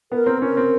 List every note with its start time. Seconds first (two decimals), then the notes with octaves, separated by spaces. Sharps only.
0.12 B3 A#4
0.27 C4
0.42 C#4 A#4
0.57 C4